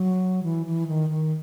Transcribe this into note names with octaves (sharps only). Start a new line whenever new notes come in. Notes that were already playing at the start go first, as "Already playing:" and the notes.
Already playing: F#3
E3
E3
D#3
D#3